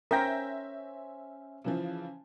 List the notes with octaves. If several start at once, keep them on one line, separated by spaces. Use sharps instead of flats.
C#4 A#4 C5 E5 G5 G6 A#6
C#3 E3 F3